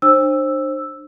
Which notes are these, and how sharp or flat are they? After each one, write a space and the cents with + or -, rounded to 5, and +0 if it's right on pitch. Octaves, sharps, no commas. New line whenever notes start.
D4 +40 C5 +25 E6 +0